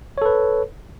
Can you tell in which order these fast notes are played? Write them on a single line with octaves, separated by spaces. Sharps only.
C#5 A4 B4